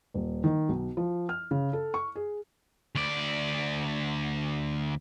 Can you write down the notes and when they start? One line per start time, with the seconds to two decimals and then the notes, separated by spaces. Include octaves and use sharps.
0.14 D#1
0.44 D#3
0.69 B1
0.97 F3
1.29 F6
1.51 C#3
1.73 A4
1.94 C#6
2.15 G#4
2.95 D2 D5